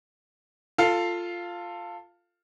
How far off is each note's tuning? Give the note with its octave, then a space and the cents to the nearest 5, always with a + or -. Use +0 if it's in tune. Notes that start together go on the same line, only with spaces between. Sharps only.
F4 +0 A4 +15 F5 +0